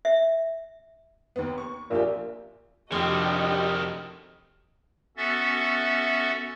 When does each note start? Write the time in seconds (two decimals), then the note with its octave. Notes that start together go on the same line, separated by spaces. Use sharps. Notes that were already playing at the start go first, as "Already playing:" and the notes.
0.05 E5
1.36 D#2 B3
1.58 C#6
1.91 A#1 A#2 G4
2.92 F1 D#3 C4 D4 F#4 G4 D#5
5.17 B3 C#4 F#4 A4 E5 A6